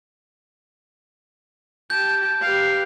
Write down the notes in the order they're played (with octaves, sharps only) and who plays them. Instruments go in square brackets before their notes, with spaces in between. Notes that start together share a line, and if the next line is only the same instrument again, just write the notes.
[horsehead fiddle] G4 A5 [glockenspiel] G6
[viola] G4 F5 [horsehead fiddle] B4 G5